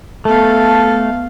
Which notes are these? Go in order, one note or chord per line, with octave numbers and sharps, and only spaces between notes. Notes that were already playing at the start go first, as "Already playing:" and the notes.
A3 B3 A4 F5